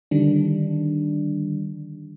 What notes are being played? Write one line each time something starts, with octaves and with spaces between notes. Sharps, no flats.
D3 D#3 G3 D4